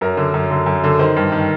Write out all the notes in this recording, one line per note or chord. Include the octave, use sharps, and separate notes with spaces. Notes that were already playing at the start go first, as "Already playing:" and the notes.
F#2 A#4
D3
F#2
D3
F#2
D3
D#3 C5
G2
D#3